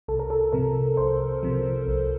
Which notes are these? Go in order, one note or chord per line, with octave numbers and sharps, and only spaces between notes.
C2 A4
A#4
A4
C3 F3 A#4
C2 C5
C3 F3
C2